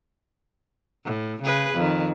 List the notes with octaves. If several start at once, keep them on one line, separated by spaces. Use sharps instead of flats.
A2
C#3 G#4 B4
F2 D#3